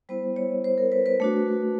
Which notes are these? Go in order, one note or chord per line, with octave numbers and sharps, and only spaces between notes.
G3 B3 E4 C5
C#5
C5
A#4
B4
B4
A3 D4 F#4